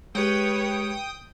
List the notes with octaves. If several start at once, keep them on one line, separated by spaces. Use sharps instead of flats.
G#3 G4 B4 C#5 G5 D#6